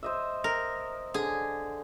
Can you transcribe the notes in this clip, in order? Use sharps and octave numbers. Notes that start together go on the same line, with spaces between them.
C5 D#5 E5
A#4
D3 G#4